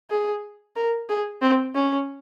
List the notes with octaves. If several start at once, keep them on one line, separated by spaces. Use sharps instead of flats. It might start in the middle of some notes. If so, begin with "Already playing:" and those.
G#4
A#4
G#4
C4
C#4